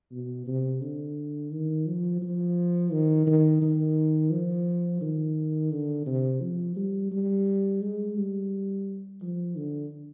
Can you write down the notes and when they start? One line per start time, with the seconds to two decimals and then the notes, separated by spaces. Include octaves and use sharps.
0.12 B2
0.47 C3
0.81 D3
1.51 D#3
1.86 F3
2.22 F3
2.92 D#3
3.27 D#3
3.62 D#3
4.31 F3
5.01 D#3
5.71 D3
6.07 C3
6.41 F3
6.77 G3
7.12 G3
7.82 G#3
8.17 G3
9.22 F3
9.56 D3